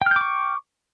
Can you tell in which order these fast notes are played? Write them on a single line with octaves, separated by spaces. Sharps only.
G5 F6 G6 D6 C#6